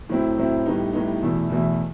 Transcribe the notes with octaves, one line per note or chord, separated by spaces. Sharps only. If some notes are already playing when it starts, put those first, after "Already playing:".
A2 F#3 C4 E4
A2 F#3 C4 E4
A2 G3 B3 D#4
A2 G3 B3 D#4
E2 B2 A3 E4
E2 B2 A3 E4